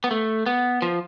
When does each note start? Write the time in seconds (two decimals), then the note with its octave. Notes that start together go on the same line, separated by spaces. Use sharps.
0.04 B3
0.11 A3
0.46 B3
0.82 F3